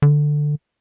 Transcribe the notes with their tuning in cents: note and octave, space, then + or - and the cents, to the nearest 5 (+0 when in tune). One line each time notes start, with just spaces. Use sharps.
D3 +10